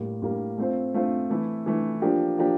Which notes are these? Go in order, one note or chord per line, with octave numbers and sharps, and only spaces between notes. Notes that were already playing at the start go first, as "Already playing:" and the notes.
Already playing: A2 G3 A#3
A2 G3 A#3
A3 C4 F4 C5
A3 C4 F4 C5
E3 A3 E4
E3 A3 E4
F3 A#3 D4 G4
F3 A#3 D4 G4